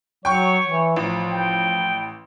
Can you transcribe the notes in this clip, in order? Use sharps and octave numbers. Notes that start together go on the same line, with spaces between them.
F#3 C#5 G5 C#6
E3
A1 F3
G5